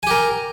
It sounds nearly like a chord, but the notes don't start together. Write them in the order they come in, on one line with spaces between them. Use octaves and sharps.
G#5 G4 A#4